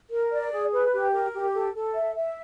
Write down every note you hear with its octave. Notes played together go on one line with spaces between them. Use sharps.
A#4
D5
G#4
B4
G4
A#4
G4
A4
A4
E5
E5